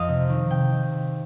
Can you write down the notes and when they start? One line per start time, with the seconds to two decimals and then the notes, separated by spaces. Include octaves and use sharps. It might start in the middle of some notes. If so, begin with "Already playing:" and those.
Already playing: F2 D#5 F5
0.08 C3
0.29 D#3
0.50 C3 G5
0.71 D#3
0.92 C3